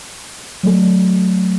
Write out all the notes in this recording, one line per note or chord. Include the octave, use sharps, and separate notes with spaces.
F#3 A3 A4